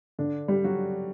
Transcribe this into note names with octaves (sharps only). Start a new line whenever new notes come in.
D3 D4
G3 G4
F#3 F#4